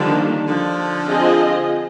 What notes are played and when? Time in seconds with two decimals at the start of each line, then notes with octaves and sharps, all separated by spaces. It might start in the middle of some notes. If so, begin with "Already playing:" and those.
Already playing: D3 D#3 F3 G3 A#3 D4
0.47 D3 F3
1.07 C4 F4 G#4 D#5